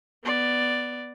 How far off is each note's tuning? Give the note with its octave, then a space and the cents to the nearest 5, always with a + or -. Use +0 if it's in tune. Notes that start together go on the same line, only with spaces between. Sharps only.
B3 +0 D5 +0